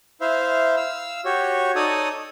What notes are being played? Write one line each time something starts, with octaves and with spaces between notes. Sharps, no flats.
E4 C5 E5 F5
F5 E6
F#4 G4 C#5
D#4 A4 C#5 D5 D#6